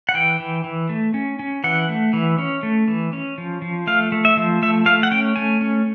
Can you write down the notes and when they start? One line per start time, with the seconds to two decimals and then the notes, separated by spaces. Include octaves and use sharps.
0.09 F#5
0.14 E3 G5
0.40 E3
0.64 E3
0.89 A3
1.14 C#4
1.39 C#4
1.64 E3 F#5
1.89 A3
2.13 E3
2.38 C#4
2.63 A3
2.88 E3
3.13 C#4
3.38 F3
3.62 F3
3.87 A3 F5
4.12 A3
4.25 E5
4.37 F3
4.62 A3 E5
4.86 A3 F5
5.03 F#5
5.11 C#4 G5
5.36 A3 G#5
5.61 C#4